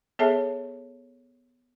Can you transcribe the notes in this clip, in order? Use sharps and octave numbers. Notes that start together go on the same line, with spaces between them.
B3 G#4 A4 C#5 E5 A5